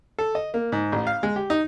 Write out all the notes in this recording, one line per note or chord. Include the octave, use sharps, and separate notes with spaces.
A4
D#5
A#3
G#2
A1
F5
G#3
G4
D#4